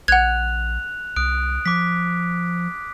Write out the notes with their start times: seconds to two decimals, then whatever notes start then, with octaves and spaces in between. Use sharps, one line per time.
0.08 A#1 F#5 F#6 G#6 F7
1.16 C2 D#6 F#6 D7
1.66 F3 D6 B6